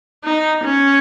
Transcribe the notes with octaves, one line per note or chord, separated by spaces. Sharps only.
D#4
C#4